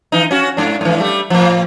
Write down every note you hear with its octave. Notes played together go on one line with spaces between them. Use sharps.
E3 D#4
C#4 F#4
G#2 D4
G#2 E3
G3 A3
A2 F3